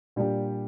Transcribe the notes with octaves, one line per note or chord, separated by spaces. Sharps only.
A#2 G3 D4 G4